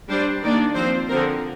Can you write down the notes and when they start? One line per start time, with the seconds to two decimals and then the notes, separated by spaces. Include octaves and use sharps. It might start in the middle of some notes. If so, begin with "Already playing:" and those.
0.10 G3 D4 C5
0.43 D#3 A#3 D4 D5
0.75 F3 C4 C5
1.09 D3 F3 C4 A#4